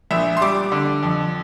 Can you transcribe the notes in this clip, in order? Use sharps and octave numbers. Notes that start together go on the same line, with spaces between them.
A#1 E5
C6
G3 D6
D3
F2